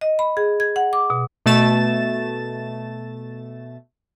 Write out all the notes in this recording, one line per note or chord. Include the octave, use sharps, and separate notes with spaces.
D#5
B5
G#4
G#6
F#5
D6
B2
B2 A3 A6 E7